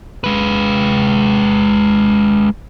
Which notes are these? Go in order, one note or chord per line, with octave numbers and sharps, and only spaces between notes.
G#3 B4